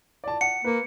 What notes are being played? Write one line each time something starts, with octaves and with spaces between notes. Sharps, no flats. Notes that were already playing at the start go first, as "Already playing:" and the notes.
D5 A5
F#5 C#7
A#3 B4